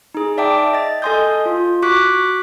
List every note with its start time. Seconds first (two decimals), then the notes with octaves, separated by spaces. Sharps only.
0.14 D#4 G#4
0.38 D5 E5 G5 A5 D6
0.73 D#5 A6
1.02 A4 D#5 G#5 C6 D#6 G6
1.46 F4
1.82 F#4 C#6 D6 F#6 B6